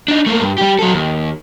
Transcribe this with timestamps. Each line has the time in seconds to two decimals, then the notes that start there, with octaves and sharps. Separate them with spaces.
0.08 D4 D#4
0.26 A3 A#3
0.41 G2
0.58 G3 G4
0.79 F#3 A4
0.94 D#2